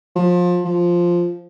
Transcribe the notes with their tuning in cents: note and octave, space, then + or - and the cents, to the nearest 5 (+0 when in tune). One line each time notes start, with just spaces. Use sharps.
F3 +25
F3 +0